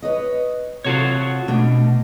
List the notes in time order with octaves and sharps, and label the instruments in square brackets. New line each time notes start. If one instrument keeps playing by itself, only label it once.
[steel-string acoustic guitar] B4 C#5 D#5
[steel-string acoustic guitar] C3 A4 [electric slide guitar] F4 F#4 C#5
[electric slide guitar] B2 [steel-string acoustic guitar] A3 D4 D#4